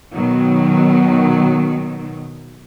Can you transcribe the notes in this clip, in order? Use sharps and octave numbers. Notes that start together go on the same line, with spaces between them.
B2 D#3 F#3